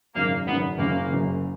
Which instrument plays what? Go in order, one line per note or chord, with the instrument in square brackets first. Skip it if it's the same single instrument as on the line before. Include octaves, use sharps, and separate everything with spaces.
[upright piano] G#1 F#2 C#3 [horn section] A#3
[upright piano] G#1 F#2 C#3 [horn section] B3
[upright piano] F#1 F#2 C#3 [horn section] A#3
[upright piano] F#1 F#2 C#3